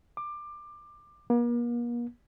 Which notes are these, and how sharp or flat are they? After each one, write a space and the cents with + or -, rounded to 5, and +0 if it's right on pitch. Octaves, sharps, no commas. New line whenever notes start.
D6 +20
A#3 +40